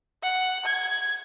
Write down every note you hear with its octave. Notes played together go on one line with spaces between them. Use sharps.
F#5
G#6